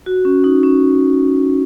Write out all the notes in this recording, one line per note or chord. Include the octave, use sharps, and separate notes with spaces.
F#4
C#4
D#4
C#4